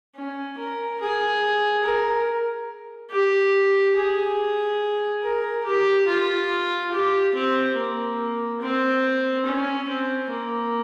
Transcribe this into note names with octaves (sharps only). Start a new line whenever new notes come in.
C#4
A#4
G#4
A#4
G4
G#4
A#4
G4
F4
G4
C4
A#3
C4
C#4
C4
A#3